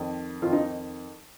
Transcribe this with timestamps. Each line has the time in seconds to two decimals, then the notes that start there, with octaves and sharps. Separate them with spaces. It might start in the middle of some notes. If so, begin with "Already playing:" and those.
Already playing: F2 D#3
0.42 F2 D#3 F4
0.52 D#4